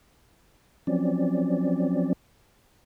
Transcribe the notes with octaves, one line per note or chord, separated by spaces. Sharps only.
F3 F#3 C4 C#4 D5